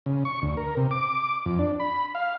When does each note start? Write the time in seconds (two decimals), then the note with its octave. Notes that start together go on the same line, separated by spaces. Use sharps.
0.06 C#3
0.25 C#6
0.42 D2
0.57 A#4
0.77 C3
0.91 D6
1.46 F2
1.59 D4
1.80 B5
2.15 F5